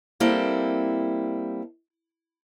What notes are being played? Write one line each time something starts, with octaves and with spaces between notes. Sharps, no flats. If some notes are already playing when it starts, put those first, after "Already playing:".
G3 A#3 C4 E4 A4